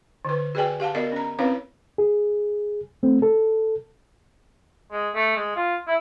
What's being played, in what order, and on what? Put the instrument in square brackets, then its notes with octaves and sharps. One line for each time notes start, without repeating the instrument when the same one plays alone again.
[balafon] D3 B4
F#4 G#4 B4 D5 G5 G#5
G4 F5 F#5 A5
B3 F#4 A#4 D5 D#5
C#4 A#5
C4 C#4 E4 B4 C#5 F5
[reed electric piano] G#4
A3 C4
A4
[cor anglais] G#3
A3
G#3
F4
E4